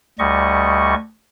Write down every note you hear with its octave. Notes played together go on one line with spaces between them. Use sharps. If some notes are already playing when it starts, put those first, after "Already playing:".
D2 G3 D#5 C#6